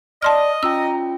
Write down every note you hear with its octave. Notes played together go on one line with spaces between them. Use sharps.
D5 D#5 A5 C6 F6
C#4 F4 G5 A#5 E6